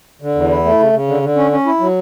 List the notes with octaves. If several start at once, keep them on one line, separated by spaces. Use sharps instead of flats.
D3
E2
E4
A3
C#3
C#3
D3
D3
C#4
C#4
E4
F#3